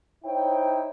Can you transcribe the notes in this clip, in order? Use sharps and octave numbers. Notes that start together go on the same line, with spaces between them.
D#4 E4 C5 C#5 G5